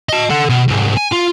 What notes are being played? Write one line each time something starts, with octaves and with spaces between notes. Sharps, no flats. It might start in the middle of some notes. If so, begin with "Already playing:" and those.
D#5 A5
A4 F#5
B2
C2 G#2
G#5
F4